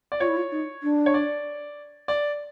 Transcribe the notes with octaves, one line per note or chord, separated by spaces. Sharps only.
D5
F4 C#5
E4
F4
D#4
D4
C#5
D5
D5